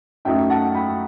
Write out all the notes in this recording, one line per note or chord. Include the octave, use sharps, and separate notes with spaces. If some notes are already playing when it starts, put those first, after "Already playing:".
F#2 F#3 A3 D#4 E5 G5
F#5 A5
G5 B5